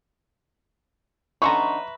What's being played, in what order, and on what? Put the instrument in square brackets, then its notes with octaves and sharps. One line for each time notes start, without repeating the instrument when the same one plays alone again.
[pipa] D3 C#4 D#4 [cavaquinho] B4 E5 A#5 [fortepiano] C6 C#6